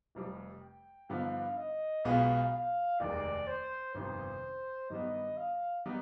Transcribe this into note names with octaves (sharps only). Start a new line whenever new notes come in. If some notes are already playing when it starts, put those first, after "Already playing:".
F1 F2 C3 G3
G5
G2 D3 F3 B3 D#4 F5
D#5
B1 B2 G#3 B3 F4 F5
F5
F1 D#2 D#3 G#3 D5
C5
G1 F2 C3 D#3 C5
G2 D#3 G3 B3 D#5
F5
D#3 G3 B3 D#4